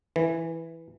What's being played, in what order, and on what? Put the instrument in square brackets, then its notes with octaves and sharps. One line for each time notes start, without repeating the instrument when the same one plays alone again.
[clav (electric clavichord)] E3